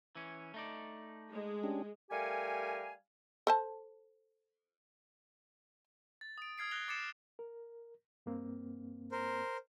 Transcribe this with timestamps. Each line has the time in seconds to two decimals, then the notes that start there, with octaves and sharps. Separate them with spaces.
0.15 E3 C#4
0.54 A3 D#4 D5
1.33 G#3
1.64 C#4 D4 G4
2.11 G3 A3 G4 A#4 F5 G#5
3.47 A4 C5 A5
6.21 A6
6.38 D#6 D7
6.58 D#6 F6 G#6 C7 D7
6.71 F#6 A#6 C7 F7 G7
6.88 D6 A6 C7 C#7 E7
7.39 A#4
8.26 G2 A#3 C4
9.12 A#4 C5